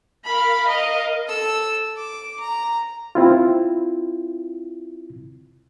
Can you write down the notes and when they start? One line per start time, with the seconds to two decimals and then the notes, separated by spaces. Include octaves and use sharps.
0.24 A#4 F5 B5
0.68 D#5
1.28 A4 E6
1.97 D6
2.40 A#5
3.15 C4 E4 F4